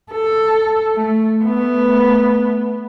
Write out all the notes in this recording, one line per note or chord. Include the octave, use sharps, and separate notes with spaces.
A4
A3
A3 B3